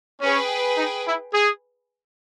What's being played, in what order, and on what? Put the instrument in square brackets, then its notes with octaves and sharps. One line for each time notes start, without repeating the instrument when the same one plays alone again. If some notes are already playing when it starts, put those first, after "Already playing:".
[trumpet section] C#4 [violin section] G#4 B4 G5
[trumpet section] D#4
E4
G#4